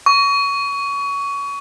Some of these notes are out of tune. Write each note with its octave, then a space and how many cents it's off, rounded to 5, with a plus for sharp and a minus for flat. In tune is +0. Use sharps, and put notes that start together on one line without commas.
C#6 +25